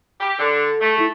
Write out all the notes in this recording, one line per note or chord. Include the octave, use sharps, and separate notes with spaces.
G4
D3 A4
A3
E4